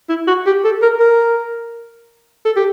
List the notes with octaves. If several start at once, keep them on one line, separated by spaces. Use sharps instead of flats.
E4
F#4
G4
A4
A#4
A#4
A4
G4